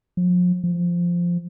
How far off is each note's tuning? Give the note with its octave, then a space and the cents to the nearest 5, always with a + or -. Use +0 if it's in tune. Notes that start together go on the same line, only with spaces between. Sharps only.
F3 +40
F3 -5